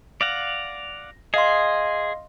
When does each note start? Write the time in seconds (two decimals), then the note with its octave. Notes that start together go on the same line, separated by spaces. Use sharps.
0.21 D5 F5 F#5 A#6
1.34 G#4 D#5 F5 C6